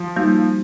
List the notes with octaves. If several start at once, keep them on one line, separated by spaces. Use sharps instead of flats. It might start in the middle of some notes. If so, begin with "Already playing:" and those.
Already playing: F3
G3 A#3 D#4 F#4